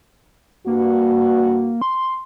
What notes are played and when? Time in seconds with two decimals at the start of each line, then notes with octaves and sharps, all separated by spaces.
0.67 G2 A#3 F#4
1.82 C6